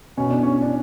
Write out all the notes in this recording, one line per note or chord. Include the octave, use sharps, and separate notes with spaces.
B2 C#4
D4
C#4
D4